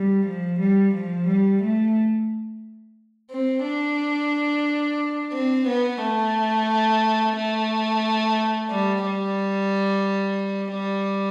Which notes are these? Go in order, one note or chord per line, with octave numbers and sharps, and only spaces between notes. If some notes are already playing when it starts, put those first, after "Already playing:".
Already playing: G3
F3
G3
F3
G3
A3
C4
D4
C4
B3
A3
A3
G3
G3
G3